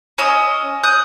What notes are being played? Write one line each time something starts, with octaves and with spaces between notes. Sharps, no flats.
C#4 D#5 D#6 E6
D#6 F#6 G6